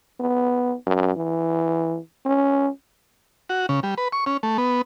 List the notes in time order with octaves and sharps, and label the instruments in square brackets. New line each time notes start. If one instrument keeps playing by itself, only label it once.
[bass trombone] B3
F#2
E3
C#4
[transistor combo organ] F#4
C#3
G3
B4
C#6
C#4
A3
B3